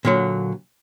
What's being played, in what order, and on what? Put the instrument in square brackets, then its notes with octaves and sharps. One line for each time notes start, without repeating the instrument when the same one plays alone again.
[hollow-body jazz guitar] A#2 D3 F#3